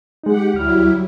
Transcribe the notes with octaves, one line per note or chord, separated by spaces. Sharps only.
G#3 D#4 G4 F#5
D2 F#3 G3 E4 F6